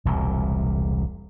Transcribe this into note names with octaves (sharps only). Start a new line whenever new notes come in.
E1 C2 A#2